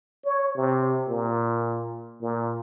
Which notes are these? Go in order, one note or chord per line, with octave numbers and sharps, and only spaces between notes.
C#5
C3
A#2
A#2